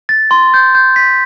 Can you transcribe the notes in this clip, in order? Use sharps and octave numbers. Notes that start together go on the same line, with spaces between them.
A6
C6
G6
G6
B6